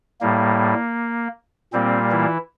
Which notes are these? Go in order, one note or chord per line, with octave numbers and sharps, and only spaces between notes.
A2 G3 A#3
A#2 G3 A#3 C4
E3 E4